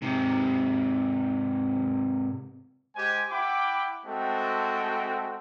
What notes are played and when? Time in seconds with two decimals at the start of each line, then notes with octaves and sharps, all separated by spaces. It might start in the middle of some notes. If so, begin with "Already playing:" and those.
0.02 G#2 C3
2.96 G#3 G4 C5 G#5
3.30 E4 F#5 G5 B5 D6
4.05 G#3 A3 C4 F#4 G5 A5